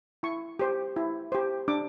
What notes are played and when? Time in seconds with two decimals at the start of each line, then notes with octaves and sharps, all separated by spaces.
0.23 E4 C#6
0.59 G4 C5
0.96 E4
1.32 G4 C5
1.68 D4 D6